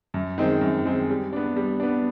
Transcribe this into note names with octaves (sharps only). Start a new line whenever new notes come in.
F#2
D#3 G#3 C4
F#2
D#3 G#3 C4
G3
B3 D4
G3
B3 D4